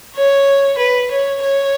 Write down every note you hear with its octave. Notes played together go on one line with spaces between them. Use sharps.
C#5
B4
C#5
C#5